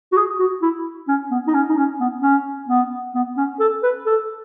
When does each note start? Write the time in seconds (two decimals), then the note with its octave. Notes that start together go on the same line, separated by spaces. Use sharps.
0.12 F#4
0.17 G#4
0.39 F#4
0.62 E4
1.08 C#4
1.31 B3
1.47 D#4
1.54 C#4
1.69 D#4
1.77 C#4
2.00 B3
2.22 C#4
2.68 B3
3.15 B3
3.37 C#4
3.60 A4
3.83 B4
4.06 A4